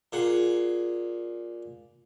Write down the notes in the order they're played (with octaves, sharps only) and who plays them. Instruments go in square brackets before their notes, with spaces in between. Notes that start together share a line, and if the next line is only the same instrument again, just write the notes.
[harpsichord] A#2 G#4 F#5